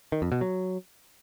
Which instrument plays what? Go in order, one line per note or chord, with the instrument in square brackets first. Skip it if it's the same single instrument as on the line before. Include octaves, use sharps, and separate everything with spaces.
[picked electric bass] D#3
F2
B2
F#3